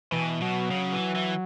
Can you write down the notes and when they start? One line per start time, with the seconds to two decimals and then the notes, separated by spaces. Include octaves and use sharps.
0.12 B2 E3
0.41 B2 F#3
0.71 C#3
0.93 E3
1.15 E3